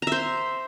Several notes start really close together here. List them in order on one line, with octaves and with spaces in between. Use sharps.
A#5 E5 C5